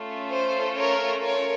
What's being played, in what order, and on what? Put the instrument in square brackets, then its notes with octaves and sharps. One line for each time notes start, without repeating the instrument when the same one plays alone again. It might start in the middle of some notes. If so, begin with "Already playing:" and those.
Already playing: [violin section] A3 C#4 F4 A4
C5
A#4 C#5
A#4 C#5